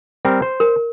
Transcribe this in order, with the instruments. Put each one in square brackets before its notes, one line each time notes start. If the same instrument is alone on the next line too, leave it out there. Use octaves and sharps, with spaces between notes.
[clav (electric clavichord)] G3 C4 A#4
C5
[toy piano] A#4